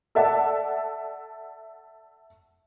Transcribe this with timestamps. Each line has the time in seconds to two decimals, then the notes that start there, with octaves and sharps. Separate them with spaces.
0.15 A4 D5 E5 F#5 A5